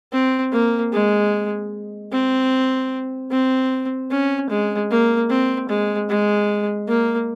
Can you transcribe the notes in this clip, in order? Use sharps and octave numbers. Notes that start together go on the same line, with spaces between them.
C4
A#3
G#3
C4
C4
C#4
G#3
A#3
C4
G#3
G#3
A#3